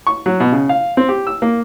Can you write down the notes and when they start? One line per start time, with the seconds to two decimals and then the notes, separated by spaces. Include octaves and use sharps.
0.07 C#6
0.26 F#3
0.40 B2
0.52 C#3
0.69 F5
0.97 C4
1.09 G4
1.27 E6
1.42 A#3